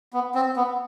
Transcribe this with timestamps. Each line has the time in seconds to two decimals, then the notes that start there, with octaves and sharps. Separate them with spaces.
0.13 B3
0.35 C4
0.56 B3